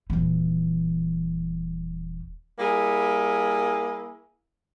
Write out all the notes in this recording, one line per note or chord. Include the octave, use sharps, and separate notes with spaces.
D#1 E3
G3 A#3 E4 G#4